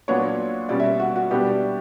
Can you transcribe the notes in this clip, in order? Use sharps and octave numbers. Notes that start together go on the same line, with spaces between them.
A#2 F#3 B3 D4 C#5
B2 G3 C#4 D5
E5
F#4
F#4
B2 G3 B3 D4 G4